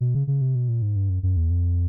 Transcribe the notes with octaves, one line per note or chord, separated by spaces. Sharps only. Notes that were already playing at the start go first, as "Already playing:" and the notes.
B2
C#3
C#3
C3
B2
A#2
G#2
G2
F#2
F#2
E2
F2